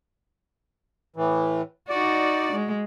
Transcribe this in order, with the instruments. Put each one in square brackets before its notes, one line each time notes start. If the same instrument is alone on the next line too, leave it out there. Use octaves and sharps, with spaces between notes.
[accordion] A2 E3
[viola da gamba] D#4 F#4 [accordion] D5
[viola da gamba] G#3